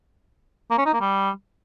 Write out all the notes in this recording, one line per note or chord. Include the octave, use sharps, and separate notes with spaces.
A#3
C#4
D#4
A#3
G3